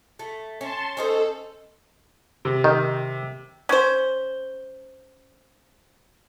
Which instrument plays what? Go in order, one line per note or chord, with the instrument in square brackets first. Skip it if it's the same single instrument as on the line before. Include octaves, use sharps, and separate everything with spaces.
[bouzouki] A3
[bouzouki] C#4 [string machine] A5 C6
[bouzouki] C#4 D#4 C5 [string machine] A4
[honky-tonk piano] C3
[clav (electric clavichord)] D#3
[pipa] C#4 C5